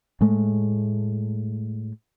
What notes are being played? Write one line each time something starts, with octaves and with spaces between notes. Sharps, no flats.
A2 G#3 A3